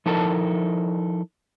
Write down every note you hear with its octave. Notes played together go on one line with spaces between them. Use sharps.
F3 D#4 E4 A4 A#4 A5